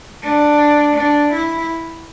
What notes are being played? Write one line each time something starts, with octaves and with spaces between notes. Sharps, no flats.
D4
D4
E4